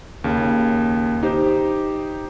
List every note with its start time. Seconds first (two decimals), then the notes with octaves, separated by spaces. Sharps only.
0.24 D#2 C#3
1.23 D#4 G4 C5